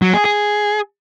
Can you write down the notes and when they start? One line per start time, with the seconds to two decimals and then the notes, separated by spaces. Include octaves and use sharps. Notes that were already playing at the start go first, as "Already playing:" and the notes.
0.02 F#3
0.14 G#4
0.25 G#4